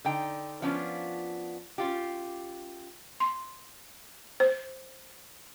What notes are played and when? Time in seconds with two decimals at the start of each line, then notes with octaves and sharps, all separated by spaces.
0.05 D3 D#4 G5
0.62 F3 B3 C#4 D4 F4
1.78 C#4 F4 G4
3.20 C6
4.40 C5